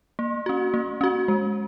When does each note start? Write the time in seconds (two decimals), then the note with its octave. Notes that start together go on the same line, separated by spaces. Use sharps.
0.19 A#3
0.46 C#4 F#4
0.74 A#3
1.01 C#4 F#4
1.28 G#3